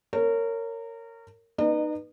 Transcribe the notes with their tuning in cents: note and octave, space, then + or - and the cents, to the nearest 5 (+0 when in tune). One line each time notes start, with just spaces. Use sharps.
A#4 -25 C#5 +0
D#4 -20 B4 -15 D#5 -45